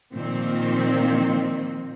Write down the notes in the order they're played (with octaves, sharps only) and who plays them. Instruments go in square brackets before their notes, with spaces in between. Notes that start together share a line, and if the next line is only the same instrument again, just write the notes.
[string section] A#2 D#3 F3 A#3 C4